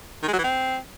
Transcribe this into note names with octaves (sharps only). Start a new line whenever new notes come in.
D#3
G#3
F#3
E3
C4